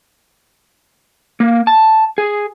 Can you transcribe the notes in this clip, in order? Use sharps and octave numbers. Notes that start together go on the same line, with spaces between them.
A#3
A5
G#4